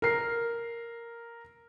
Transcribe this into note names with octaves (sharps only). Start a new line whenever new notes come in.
A#4 C7